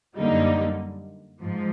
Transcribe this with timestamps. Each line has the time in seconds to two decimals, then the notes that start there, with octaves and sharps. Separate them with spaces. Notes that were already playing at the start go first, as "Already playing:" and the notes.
0.18 F#2 D3 G3 A#3 D#4
1.41 G#2 F3